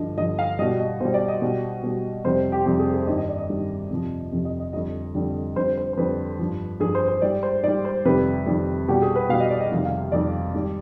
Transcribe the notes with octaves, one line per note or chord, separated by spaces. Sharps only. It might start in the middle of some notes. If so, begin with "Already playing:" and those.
Already playing: G2 D3 F3 D#5
G2 D3 F3 D#5
F5
B2 G3 D#5
D#5
B2 G3 C5
D5
D#5
B2 G3
B2 G3
F2 C3 G3 C5
G4
F2 C3 G3 G4
G#4
G#4
G2 D#3 G3 D#5
D#5
D5
D#5
G2 D#3 G3
F2 C3 F3
F2 C3 F3
D#5
D#5
F2 D3 G3 D#5
F2 D3 G3
F2 D3 G3 C5
C5
C5
F2 D3 G3 B4
G2 F3
G2 F3 G#4
C5
C5
G#2 G3 D5
C5
G#2 G3 D5
C5
F2 C3 D#3 G3 B4
F2 C3 D#3 G3
B2 G3 G4
G#4
B4
B2 G3 F5
D#5
D5
D#5
F2 C3 D#3 G3
F5
F2 C3 D#3 G3 D5
G#2 D#3 G3